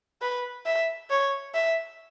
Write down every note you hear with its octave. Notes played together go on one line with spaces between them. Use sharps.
B4
E5
C#5
E5